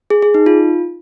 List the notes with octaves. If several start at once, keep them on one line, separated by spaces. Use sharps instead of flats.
G#4
G#4
D#4
F4